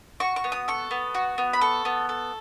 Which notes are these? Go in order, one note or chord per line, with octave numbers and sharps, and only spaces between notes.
F#4 C#6
C#6
B3
D#6
A4 C#6
B3
F#4
B3
B5
A4 C#6
B3
A4